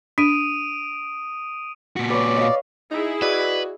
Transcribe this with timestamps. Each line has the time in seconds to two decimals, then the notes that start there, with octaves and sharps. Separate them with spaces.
0.18 D4 D#6 D7 D#7
1.96 A#2 F#4
2.10 B4 C#5 D5
2.38 D#5 F5
2.91 D#4 E4 G#4
3.22 F#4 B4 D5 D#5